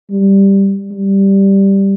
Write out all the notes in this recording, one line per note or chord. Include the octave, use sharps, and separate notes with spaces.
G3
G3